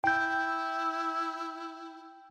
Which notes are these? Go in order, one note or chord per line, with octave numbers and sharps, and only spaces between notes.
E4 G5 G6